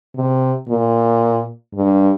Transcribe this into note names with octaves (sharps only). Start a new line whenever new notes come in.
C3
A#2
G2